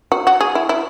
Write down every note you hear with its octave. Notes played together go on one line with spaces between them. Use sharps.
F#4
F#4
G#4
E4
E4